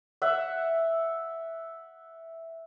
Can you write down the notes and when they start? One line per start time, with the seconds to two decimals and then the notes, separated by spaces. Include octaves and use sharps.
0.22 E5 F#5